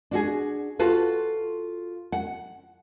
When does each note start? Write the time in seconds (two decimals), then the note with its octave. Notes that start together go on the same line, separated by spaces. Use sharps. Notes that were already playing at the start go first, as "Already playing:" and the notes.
0.11 D4 F#4 G#4
0.79 F4 F#4 A4 B4 F5
2.12 F#5